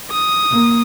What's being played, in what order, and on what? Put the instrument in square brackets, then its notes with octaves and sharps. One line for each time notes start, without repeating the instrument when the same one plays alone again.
[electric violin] D#6
[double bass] A#3